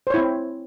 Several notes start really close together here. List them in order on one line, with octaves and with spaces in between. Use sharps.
C5 C#5 E4 C4